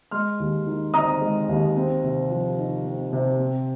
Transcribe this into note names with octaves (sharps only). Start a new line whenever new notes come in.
G#3 C6 F6
D#2
D#3
C4 A#5 D#6
G#3
D#2
C4
C3
F3
D#4
C4
C3
C4